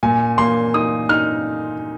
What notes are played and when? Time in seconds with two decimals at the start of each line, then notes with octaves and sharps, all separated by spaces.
0.03 A#2 G#5
0.38 A#3 C6
0.74 D#4 D#6
1.09 D#4 F6